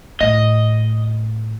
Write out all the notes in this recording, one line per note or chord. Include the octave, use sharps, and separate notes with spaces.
A2 D#5